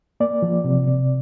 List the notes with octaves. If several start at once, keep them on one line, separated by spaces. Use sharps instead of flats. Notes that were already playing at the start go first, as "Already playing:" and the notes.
A#3 D5
F3
C3
C3